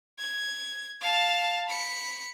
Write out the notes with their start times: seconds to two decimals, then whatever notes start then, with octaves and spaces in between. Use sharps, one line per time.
0.19 G#6
1.01 F5 A5
1.69 B5 C#7